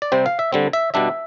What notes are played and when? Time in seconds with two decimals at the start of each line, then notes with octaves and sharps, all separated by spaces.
0.02 D5
0.12 C3 G3 C4 C5
0.26 F5
0.39 E5
0.53 D3 G3 C4
0.73 E5
0.94 B2 G3 D4 E5